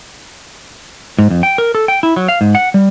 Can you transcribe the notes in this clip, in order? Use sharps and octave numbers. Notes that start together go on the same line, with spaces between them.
G#2
F2
G5
A#4
A4
G5
E4
F#3
F5
G#2
F#5
G3